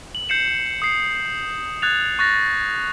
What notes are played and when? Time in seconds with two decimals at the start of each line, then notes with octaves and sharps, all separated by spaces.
0.15 F#7
0.29 G6 C7 C#7 E7 F#7
0.82 D#6 C7
1.82 D#6 F#6 G#6 A6 F7
2.19 C#6 F#6 A6 A#6